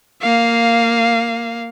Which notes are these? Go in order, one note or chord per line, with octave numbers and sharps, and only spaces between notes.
A#3 F5